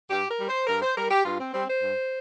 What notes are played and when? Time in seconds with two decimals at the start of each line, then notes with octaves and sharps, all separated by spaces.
0.10 G2 G4
0.29 A#4
0.38 G3
0.48 C5
0.67 G2 A#4
0.82 C5
0.95 G3 A#4
1.10 G4
1.24 G2 F4
1.39 C4
1.53 G3 C4
1.67 C5
1.81 G2